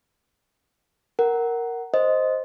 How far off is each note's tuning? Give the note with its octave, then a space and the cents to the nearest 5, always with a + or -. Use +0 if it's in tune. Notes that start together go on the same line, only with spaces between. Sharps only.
A#4 +0 F#5 +15
C5 +0 D#5 +0